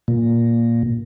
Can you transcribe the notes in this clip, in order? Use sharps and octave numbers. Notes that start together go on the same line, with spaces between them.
A#2